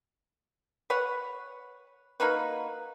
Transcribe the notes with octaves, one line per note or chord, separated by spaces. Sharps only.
B4 C#5 F#5
A#3 D#4 F#4 B4